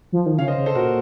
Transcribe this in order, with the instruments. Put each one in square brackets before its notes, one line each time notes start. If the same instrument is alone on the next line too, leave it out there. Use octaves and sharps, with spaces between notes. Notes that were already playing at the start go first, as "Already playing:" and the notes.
[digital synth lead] F3
D#3
[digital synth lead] C#3 [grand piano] C#5 F5
[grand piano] C5 D#5
[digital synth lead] C#3
[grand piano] A4 C5
[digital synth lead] A#2 [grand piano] F#4 A#4